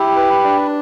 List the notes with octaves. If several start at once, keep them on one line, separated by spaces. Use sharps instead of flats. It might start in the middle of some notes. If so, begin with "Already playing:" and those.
Already playing: E4 G4
B4
D4